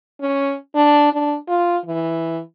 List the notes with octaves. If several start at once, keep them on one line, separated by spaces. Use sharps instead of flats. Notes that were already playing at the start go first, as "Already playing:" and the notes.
C#4
D4
D4
F4
E3